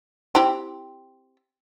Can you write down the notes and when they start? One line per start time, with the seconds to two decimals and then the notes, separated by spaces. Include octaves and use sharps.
0.35 C4 E4 G4